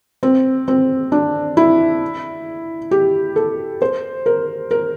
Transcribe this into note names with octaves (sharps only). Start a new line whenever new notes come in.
C4
C4
D4
E4
G4
A4
C5
A#4
A#4